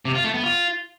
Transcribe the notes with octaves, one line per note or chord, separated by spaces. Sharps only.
C3
F4
A3
B3
F4